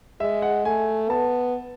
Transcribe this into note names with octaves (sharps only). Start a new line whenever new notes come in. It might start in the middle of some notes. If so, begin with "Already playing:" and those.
G#3 E5
F#5
A3 G#5
B3 A5